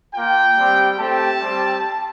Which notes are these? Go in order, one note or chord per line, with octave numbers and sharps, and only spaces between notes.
A#3 F4 G5
G3 C4 G4
A3 C4 G4 A5
G3 C4 G4